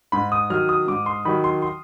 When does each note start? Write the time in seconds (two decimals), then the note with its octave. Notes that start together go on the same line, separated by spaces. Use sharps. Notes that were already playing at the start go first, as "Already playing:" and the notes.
0.12 G#2 B5
0.32 D#6
0.50 D#3 F#3 F6
0.69 D#6
0.88 G#2 D6
1.06 C6
1.25 D#3 F#3 B5
1.44 C6
1.62 C6